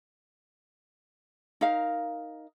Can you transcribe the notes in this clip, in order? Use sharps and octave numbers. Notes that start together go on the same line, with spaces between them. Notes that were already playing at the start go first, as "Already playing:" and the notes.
D#4 A#4 F5